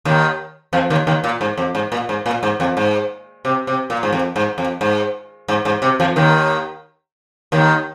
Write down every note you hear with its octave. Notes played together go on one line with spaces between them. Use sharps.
D#2 D#3
F2 F3
D#2 D#3
D#2 D#3
A#2
G#2
F2
G#2
A#2
G#2
A#2
G#2
F2
G#2
C3
C3
A#2
G#2
F2
G#2
F2
G#2
G#2
G#2
C3
F2 F3
D#2 D#3
D#2 D#3